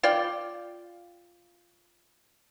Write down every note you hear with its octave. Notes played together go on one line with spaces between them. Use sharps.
F4 D5 G5